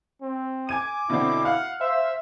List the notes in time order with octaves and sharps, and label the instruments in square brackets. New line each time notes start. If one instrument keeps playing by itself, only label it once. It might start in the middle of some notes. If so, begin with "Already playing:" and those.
[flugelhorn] C4
[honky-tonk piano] G#5 G#6 D#7 [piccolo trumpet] D6
[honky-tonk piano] B2 D3 C4 [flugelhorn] E4
[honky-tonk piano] F5 F6 [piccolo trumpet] F#5
[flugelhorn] C5 [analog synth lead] E5 [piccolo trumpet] E6